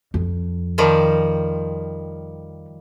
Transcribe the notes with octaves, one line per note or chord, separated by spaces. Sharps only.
F2
D#3 F3 G3